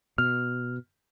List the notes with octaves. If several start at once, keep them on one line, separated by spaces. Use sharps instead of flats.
B2 F6